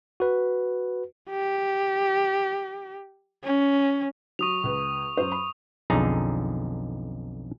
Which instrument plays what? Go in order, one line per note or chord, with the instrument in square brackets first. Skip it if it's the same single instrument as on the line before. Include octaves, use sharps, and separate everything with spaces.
[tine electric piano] F#4 B4
[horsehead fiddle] G4
C#4
[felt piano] F#3 [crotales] C#6 D#6 F7
[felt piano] C#2 B4
F#2 C5
B5
[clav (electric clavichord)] B1 F2 D3 D#4 G#4 A#5